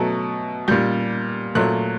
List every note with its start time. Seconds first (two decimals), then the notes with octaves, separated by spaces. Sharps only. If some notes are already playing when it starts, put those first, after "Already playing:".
Already playing: B2 F#3 A3
0.68 A#2 G3 G6
1.55 A#2 F#3 A3 F#6